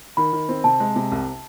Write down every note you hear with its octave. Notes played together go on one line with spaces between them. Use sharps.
D#3 B5
D#3
C4
C3 A5
G#3
C3
C2